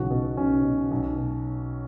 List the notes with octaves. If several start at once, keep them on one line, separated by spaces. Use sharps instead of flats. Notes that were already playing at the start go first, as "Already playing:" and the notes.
Already playing: B1 C#3 E3 F#4
B2
B1 C#4
B2
B1
B2